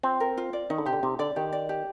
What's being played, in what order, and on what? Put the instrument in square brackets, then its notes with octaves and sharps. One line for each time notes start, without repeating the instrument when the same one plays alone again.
[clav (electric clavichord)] C4 [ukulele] F4
[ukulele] A#4
F4
D5
[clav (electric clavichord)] D#3 [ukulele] D#4
[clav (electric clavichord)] D3
[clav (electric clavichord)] C3 [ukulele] G4
[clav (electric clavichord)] D3
[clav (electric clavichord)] C3 [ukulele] D#4
[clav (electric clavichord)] D3 [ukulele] D5
[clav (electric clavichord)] D#3 [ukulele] G4
[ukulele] D5
G4